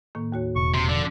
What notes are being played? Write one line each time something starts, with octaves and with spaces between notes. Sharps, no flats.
A2 D#3 A#3
D#2 F#4 C#5
E1 C#6
C3 C6
D3 F3 D5